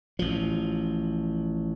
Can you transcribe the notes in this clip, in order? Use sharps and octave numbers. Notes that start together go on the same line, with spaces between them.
A1 F3